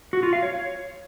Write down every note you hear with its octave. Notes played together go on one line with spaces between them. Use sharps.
F#4
F4
F5
C#5